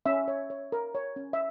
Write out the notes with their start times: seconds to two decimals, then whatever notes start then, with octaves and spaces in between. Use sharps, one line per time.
0.06 C#4 E5
0.28 C#5
0.50 C#5
0.72 A#4
0.95 C#5
1.16 C#4
1.33 E5